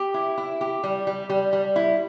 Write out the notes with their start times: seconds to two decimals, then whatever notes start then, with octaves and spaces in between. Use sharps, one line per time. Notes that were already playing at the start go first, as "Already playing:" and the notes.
Already playing: G4
0.14 E4
0.38 E4
0.61 G4
0.84 G3
1.07 G3
1.30 G3
1.53 G3
1.76 E4